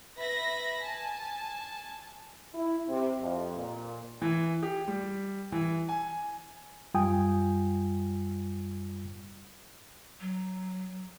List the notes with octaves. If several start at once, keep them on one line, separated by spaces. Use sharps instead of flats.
B4 E5 B5 A#6
G#5 A5
E4
C3
F2
A#2
E3
G4
G3
E3
G#5
F#2 G3 F4 G5 G#5 D#6
F#3